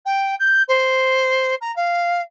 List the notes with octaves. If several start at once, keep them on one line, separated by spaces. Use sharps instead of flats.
G5
G6
C5
A#5
F5